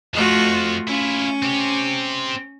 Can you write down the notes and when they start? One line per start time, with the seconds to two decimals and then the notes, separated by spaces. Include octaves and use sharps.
0.14 F2 F3 A3 F4 F#4
0.88 C#4 E4 F4
1.43 C4 G4